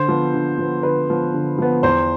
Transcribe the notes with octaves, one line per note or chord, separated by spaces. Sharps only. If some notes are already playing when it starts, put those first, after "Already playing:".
Already playing: D3 C5
F3 B3
D3
F3 B3
D3 B4
F3 B3
D3
F3 B3
E2 C5